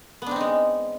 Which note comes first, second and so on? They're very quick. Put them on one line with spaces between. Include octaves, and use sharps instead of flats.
B3 D4 C4 D#4 G#3